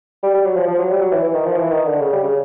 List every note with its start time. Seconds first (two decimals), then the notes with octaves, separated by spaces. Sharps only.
0.23 G3
0.34 G3
0.45 F#3
0.56 F3
0.67 F3
0.78 F#3
0.90 G3
1.01 F#3
1.12 E3
1.23 E3
1.34 D#3
1.46 F3
1.56 E3
1.71 D#3
1.87 D3
2.01 C#3
2.12 G3
2.23 C#3